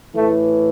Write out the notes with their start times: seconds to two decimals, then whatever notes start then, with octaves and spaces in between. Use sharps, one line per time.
0.15 A2 E3 A3